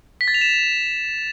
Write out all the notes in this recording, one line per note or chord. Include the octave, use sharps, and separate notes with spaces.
B6
A6
F7
E7